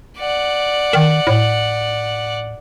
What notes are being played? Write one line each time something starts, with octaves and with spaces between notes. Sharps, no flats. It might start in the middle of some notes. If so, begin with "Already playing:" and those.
D5 F#5
D#3
A2